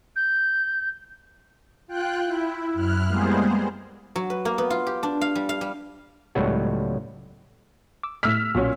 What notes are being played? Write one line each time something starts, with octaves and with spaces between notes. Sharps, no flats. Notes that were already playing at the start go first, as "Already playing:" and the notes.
G6
F4 G5 F#6
E4
F#2 E4 F6 F#6
G3 G#3 A#3 B3 G#4 C5
F#3
B4
A#3
B3
F4
G4
D4
F5
G3
F5
G3
C#2 A2 F#3 G3 B3 F#4
D6 E6
A2 A3 D6 E6 F6 B6
B1 A#2 C#4 F#4